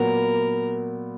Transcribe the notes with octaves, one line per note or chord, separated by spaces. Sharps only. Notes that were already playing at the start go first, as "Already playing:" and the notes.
Already playing: A#2 F#3 B3 A#4